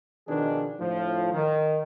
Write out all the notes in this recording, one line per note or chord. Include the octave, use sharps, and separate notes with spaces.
B2 D#3 F3 D4 G#4
D2 A2 F3
D#3